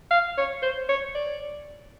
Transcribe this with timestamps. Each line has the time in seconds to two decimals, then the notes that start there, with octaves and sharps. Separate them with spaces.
0.11 F5
0.37 C#5
0.63 C5
0.89 C#5
1.15 D5